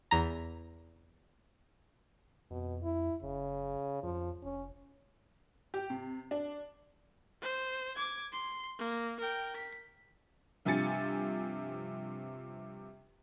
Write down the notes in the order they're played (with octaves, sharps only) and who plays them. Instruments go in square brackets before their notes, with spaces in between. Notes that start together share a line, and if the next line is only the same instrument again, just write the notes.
[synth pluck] E2 A#5
[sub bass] F2 [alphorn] B2
[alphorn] E4
[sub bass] F#1 [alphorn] C#3
[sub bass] F2 [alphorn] F3
[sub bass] F1 [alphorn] C#4
[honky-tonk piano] G4
C3
D4
[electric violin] C5
D6 G#6
C6
A#3
A#4 G5
B6
[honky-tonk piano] G2 C3 F3 G#5 A6 C#7